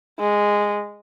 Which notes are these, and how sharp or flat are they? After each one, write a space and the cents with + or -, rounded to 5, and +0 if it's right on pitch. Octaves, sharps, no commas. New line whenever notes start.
G#3 -10